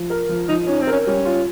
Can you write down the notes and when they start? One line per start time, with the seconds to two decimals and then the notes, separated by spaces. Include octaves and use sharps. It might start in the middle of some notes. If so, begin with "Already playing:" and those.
Already playing: F3
0.10 A#4
0.29 F3
0.49 F3 D#4
0.67 C#4 D#4
0.81 C4
0.87 A#4
0.92 C#4
1.07 G3 C#4
1.25 F4